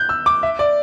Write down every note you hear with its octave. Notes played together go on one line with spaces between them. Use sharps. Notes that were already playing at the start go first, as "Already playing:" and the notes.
Already playing: F#6 G6
E6
D6
E5
D5